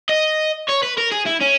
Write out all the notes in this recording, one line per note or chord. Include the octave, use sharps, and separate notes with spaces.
D#5
C#5
B4
A#4
G#4
E4
C#4